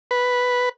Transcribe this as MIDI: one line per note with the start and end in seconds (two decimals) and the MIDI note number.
0.11 0.69 71